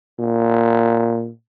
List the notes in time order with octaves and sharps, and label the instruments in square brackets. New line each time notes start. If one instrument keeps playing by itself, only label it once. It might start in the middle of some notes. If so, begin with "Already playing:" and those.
[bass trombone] A#2